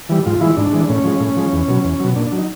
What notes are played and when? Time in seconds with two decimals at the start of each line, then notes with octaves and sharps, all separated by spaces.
0.09 E3 G3
0.26 G#2 F4
0.41 E3 G#3 E4
0.57 G#2 D4
0.73 E3 G#3
0.89 A2 C#4
1.04 F3 G#3
1.20 A2
1.37 F3 G#3
1.53 E2
1.68 B2 F#3
1.84 E2
2.00 B2 F#3
2.16 A#2 D4
2.27 D4
2.32 F#3
2.38 D#4